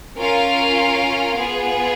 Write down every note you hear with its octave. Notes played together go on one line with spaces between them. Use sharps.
C#4 F4 A#4 F5
B3 F4 G#4